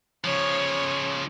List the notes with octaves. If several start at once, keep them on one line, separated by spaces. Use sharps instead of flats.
C#3 F3 C#5